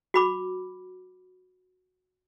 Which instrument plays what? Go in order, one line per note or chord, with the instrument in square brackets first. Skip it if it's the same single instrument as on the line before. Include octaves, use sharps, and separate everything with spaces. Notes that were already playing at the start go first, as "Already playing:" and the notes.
[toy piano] F#4 B5 D6